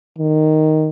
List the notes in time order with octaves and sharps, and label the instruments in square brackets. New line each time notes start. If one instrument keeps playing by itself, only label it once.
[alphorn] D#3